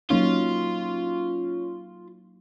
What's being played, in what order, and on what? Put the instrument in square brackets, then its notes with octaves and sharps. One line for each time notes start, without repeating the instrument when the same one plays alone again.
[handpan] F#3 A#3 D#4 [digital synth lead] C#4 [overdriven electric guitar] F4